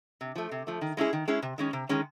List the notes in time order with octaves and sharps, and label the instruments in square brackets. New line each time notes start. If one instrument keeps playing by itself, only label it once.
[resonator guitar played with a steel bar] C3
F3 A3
C3
F3 A3
D#3
G#3 C#4 E4 G#4
D#3
G#3 C#4 E4 G#4
C3
D#3 G#3 C#4
C3
D#3 G#3 C#4